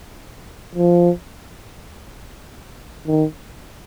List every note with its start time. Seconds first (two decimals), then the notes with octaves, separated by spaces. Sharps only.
0.75 F3
3.07 D#3